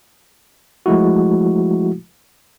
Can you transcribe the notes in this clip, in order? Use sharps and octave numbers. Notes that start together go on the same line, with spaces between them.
F3 G#3 A3 E4 F#4